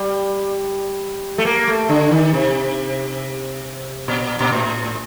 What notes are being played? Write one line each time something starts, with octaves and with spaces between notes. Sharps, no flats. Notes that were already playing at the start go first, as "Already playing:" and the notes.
Already playing: G3
A3
A#3
A3
D3
D#3
C3
A#2
A#2
A2